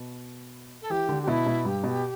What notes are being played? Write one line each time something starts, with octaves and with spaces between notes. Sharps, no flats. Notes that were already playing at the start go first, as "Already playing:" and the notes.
Already playing: B2
A4
E3 G4
D3
G4
B2 E4
B2
G2 G4
B2